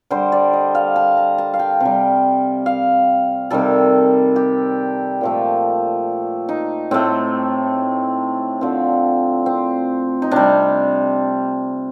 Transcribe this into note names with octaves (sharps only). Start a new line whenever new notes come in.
D3 G3 C5
D5
D#5
F5
A5
A#5
A5
F5
G5
C3 G3
F5
C3 D#3 G3 A4
G4
A#2 F3 A3
D#4
A2 A3 C4
D3 F3 A3 C4
C4
D#4
C3 G3 D4